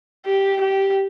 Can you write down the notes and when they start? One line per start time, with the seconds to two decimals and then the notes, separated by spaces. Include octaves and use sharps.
0.26 G4
0.61 G4